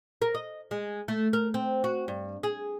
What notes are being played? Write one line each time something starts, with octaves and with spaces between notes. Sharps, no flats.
A#4
D#5
G#3
A3
A#4
C4
F#4
G2
G#4